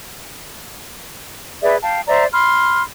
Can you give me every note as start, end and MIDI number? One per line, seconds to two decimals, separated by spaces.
1.62 1.77 68
1.62 1.77 71
1.62 1.77 74
1.62 1.77 76
1.82 2.01 77
1.82 2.01 79
1.82 2.01 81
2.08 2.26 72
2.08 2.26 74
2.08 2.26 76
2.08 2.26 82
2.32 2.82 83
2.32 2.82 84
2.32 2.82 89